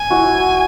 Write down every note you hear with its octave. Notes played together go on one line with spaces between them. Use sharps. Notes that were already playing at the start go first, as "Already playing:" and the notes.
Already playing: G#5
E4 F#4